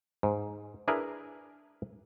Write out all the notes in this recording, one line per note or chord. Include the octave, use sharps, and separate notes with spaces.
G#2
D4 E4 G#4 A#4 B4